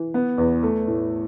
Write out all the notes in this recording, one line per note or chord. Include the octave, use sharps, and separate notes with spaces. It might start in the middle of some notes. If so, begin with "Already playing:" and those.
Already playing: E3
B3
E2
A3
A2